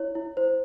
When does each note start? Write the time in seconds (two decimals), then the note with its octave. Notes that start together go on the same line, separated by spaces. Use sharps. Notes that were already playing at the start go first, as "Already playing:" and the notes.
Already playing: E4 C#5
0.15 E4
0.37 C5